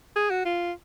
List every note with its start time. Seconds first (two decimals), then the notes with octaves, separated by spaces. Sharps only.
0.16 G#4
0.31 F#4
0.45 F4